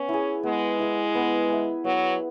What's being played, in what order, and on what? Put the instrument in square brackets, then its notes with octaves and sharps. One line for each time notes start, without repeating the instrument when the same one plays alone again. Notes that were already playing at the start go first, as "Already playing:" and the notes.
Already playing: [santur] B3 [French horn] C#4
[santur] E4 G#4
[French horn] G#3 [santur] B3
[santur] E4 G#4
B3
G#4 E5
[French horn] F#3 [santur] B3